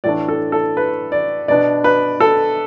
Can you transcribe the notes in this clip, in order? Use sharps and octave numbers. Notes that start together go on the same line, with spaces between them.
A2 E3 A3 D4 D5
A4
A4
B4
D5
B2 B3 D4 D5
B4
A4